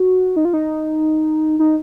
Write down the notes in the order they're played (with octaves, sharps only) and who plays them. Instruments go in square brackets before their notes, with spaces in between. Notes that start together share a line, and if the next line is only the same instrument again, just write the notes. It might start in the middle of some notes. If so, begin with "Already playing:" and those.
Already playing: [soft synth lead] F#4
D#4
F4
D#4
D#4